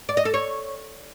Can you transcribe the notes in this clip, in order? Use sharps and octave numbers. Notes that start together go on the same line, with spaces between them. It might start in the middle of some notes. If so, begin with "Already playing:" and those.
D5
D#5
A4
C#5